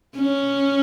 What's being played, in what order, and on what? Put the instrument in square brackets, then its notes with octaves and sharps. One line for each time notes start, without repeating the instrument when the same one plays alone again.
[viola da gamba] C#4